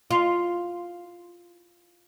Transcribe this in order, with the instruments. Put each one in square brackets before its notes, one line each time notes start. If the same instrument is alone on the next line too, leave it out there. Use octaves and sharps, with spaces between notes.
[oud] F4